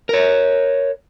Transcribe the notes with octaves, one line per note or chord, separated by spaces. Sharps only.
A#4 C#5